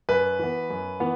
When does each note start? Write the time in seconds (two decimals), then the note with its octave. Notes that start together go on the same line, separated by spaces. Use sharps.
0.09 F#2 B4
0.39 E3 B3
0.70 F#2
1.00 E3 B3